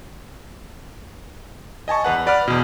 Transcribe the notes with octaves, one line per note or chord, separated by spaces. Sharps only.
D#5 G#5 A5 C#6
E2 B4 F#5
B4 D5 F#5 B5 F6
E2 B2